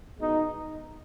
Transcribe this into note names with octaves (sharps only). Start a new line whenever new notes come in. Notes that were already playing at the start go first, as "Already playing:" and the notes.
B2 G#3 B3 D#4